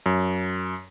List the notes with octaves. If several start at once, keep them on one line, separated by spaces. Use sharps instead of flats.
F#2